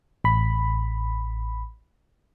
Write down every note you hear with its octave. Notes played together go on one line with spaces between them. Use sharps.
A1 B5